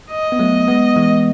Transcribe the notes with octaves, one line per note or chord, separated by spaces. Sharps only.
D#5
B3
F#3 A3
G#3 B3
E3 G#3